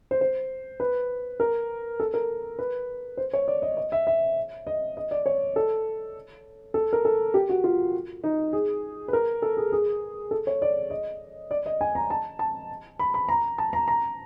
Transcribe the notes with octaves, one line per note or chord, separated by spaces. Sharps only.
C5
C5
B4
A#4
A4
A#4
B4
C5
C#5
D5
D#5
D#5
E5
E5
D#5
D#5
D5
C#5
A4
A4
A#4
A4
G4
F#4
F4
D#4
G#4
B4
A#4
A4
G#4
G#4
A4
C#5
D5
D#5
D5
D#5
G#5
A#5
A5
A5
B5
B5
A#5
A5
A#5
A#5